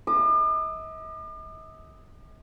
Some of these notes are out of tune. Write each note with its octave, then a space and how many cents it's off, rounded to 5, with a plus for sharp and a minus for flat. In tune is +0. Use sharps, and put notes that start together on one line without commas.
D#5 +45 D6 +45